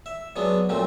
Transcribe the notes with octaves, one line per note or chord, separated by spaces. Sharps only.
E5
F#3 G#3 B3 D4
A#2 F#3 A3 C4